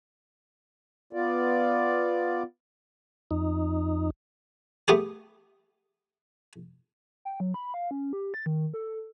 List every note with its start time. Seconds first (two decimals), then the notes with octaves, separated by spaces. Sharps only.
1.13 B3 F4 D5
3.31 F2 D#4
4.88 A3 B3 G4 G#4
7.25 G5
7.40 F#3
7.54 B5
7.74 F5
7.91 C#4
8.13 G4
8.34 A6
8.46 D#3
8.74 A4